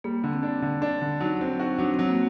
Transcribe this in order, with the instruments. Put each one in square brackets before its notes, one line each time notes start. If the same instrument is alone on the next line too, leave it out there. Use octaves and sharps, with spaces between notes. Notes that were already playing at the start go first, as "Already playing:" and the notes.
[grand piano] G3 [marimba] A#3
[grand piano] D3
[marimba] C4
[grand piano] D4
D3
D4
D3
[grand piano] F#3 [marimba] D#4
[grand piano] C4 [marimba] D#4
[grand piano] F#4
[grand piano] F#3 [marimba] D4
[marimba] C4
[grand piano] F#3
[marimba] A#3